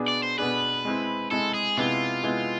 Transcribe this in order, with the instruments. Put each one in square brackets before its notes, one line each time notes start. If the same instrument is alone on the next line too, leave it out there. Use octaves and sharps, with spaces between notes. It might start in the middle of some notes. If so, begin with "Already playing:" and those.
Already playing: [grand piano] B2 B3 D4 G#4
[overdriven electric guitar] D5
C5
[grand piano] B2 B3 D4 G#4 [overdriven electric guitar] B4
[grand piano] G#3 C4 E4
[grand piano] G#3 C4 E4 [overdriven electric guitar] A4
[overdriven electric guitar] G#4
[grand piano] C3 G#3 B3 E4 [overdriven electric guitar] F4
[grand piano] C3 G#3 B3 E4